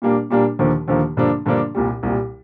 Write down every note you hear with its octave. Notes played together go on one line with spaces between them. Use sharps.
A#2 G3 A#3 D4
A#2 G3 A#3 D4
D#2 D3 F3 A#3
D#2 D3 F3 A#3
G2 D3 F3 A#3 D4
G2 D3 F3 A#3 D4
C2 A#2 G3
C2 A#2 G3